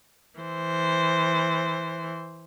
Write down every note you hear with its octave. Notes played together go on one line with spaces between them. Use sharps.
E3 C5